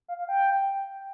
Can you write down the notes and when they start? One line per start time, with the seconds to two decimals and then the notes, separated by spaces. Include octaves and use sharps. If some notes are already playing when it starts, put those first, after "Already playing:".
0.08 F5
0.19 F5
0.29 G5